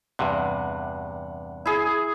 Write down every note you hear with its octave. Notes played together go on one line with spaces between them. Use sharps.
E2 G2 C3 F#5
E4 G#4